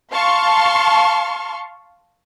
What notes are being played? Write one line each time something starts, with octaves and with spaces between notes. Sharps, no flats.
F5 A5 C6 C#6